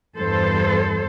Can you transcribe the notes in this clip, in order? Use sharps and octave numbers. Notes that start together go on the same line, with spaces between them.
E2 G2 A4 C5